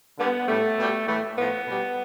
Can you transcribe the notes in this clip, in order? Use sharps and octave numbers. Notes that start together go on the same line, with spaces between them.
D3 G3 B3
A2 G3 A3
B2 G3
A2 E3 A3
A2 F3 A3 B3
B2 G3